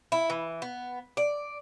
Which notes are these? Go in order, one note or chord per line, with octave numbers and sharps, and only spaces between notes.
E4
E3
B3
D5